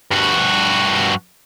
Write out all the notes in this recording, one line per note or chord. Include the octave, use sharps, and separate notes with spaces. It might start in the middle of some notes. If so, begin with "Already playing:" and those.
G2 F#4